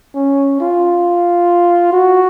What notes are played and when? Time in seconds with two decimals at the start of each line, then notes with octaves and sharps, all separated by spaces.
0.14 C#4
0.60 F4
1.93 F#4